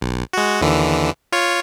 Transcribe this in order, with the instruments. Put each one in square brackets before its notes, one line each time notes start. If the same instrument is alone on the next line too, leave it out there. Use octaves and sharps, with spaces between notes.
[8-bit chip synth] B1
G#3 F#4
D#2 D3 E3
F4 C#5